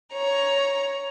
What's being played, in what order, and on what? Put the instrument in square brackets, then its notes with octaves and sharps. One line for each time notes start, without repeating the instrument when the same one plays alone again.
[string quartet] C#5 A#5